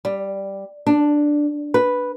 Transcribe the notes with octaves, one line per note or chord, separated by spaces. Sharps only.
G3
D4
B4